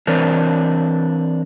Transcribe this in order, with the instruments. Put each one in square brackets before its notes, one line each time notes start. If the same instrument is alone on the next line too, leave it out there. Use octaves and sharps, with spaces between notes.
[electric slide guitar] E3 C4 D4 A#4 C5 C#5